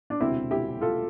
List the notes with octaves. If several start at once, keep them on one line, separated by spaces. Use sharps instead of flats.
D4
E1 D2 C3 C4 E4
E4 G4
F4 A4